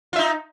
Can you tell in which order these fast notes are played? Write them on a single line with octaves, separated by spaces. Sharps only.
F4 E5 D#4